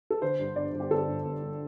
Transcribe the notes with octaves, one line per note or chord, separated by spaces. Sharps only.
A4
D3 C5
G2
G1 D5
G1
G4
G1 A4
G2
G1
G2